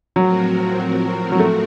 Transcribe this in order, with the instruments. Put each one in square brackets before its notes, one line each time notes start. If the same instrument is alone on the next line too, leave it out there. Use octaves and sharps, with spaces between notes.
[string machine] A2 F3 C4 F#4 A#4 [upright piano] F#3
[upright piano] F#3
A3